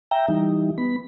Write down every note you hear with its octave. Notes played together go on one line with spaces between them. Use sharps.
E5 G5 A#5
E3 G3 D#4
B3 B5